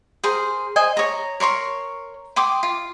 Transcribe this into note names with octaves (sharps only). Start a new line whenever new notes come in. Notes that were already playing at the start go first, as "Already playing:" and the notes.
G#4 A#4 C5
C5 D#5 G#5
C#5 A#5
A#4 C#5 C6 C#6
G5 C6 D6 D#6
F4